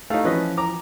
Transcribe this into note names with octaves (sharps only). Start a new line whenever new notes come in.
A3 D#4 F5
E3 F3 C#4 B4 D#5
A#5 D6